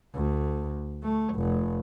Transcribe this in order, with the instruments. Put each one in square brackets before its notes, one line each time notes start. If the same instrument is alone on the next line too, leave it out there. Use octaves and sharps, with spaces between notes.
[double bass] D2
A3
F1